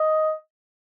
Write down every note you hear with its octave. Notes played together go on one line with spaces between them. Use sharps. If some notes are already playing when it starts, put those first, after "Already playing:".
Already playing: D#5